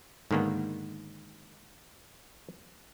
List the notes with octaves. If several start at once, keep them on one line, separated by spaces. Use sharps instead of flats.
G#2 D3 D#3 A#3 B3